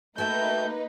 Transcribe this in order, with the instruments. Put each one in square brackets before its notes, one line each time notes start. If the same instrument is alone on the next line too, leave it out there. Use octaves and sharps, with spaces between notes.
[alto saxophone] A3 [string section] A#3 D#4 B4 [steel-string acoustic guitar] F#4 E5 G5 [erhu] G6